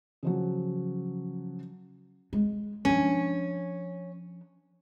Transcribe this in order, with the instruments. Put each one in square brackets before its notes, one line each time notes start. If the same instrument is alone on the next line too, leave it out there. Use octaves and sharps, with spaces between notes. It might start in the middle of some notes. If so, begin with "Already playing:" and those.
[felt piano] C#3 F3 F#3
[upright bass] G#3
[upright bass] F3 D4 [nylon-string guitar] C#4